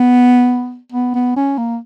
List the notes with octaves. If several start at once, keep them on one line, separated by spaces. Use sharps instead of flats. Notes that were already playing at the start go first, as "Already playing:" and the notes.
Already playing: B3
B3
B3
C#4
A#3